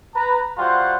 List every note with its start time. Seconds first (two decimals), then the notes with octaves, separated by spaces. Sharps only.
0.15 B4 A#5
0.58 G3 F4 F#4 C5 F#5